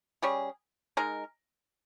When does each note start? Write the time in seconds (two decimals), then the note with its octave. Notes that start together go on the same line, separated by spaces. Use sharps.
0.22 G3 C#4 G#4
0.97 G#3 D#4 A#4